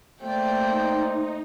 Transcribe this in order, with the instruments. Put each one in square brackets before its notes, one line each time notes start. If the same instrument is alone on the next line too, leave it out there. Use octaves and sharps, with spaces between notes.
[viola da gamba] A3 A#3 [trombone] C5 [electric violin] D5 G5
[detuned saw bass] D#4